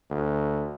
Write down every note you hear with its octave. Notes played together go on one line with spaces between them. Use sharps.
D2